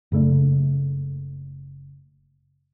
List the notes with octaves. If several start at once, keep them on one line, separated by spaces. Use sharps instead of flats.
F#1 C#3 A3 D4